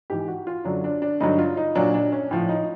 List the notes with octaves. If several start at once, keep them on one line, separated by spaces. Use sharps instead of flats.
G#2 E3 G4
F#4
F4
F#2 D3 F#3 D4
D4
D4
G2 D3 F#3 D#4
F4
D#4
A#2 F#3 D4
D4
C#4
A2 F3
D#4